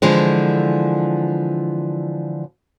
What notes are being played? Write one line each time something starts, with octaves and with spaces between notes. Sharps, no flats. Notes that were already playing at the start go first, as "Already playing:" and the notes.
D3 E3 F3 G#3